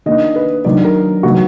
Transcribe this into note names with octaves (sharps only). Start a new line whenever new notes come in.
D#3 A#3 D4 D#5
B4
D#3 F#3 D4 D5
A#4
D#3 F#3 B3 F#4